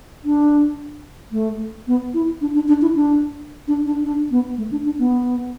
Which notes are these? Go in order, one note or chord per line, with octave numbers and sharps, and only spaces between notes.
D4
A3
B3
E4
D4
D4
D4
E4
D4
D4
D4
D4
B3
A3
D4
D4
B3